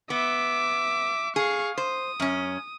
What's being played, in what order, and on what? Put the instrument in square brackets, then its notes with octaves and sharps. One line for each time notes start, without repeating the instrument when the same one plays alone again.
[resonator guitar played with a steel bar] B3 [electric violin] E5 D6
[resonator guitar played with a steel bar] G#4 [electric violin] F5 C#6
[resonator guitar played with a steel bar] C5 [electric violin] D#6
[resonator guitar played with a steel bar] F#2 C#4